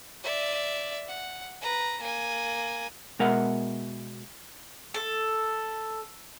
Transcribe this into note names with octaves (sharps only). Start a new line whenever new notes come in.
D5 E5
F#5
B4 A#5
A#3 G#5
B2 G#3 A#4 E5 F#5
A4